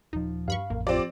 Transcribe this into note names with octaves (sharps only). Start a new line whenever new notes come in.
D#1 F3 D#4
G2 F5 B5 C#6
A1 F2 A#3
F3 C4 F4 G4 D5